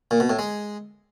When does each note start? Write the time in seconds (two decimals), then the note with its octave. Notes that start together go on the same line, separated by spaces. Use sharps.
0.11 A#2
0.20 B2
0.30 A2
0.39 G#3